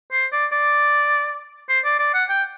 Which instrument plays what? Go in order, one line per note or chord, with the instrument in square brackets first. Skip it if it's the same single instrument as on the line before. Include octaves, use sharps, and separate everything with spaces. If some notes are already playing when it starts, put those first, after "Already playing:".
[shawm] C5
D5
D5
C5
D5
D5
F#5
G5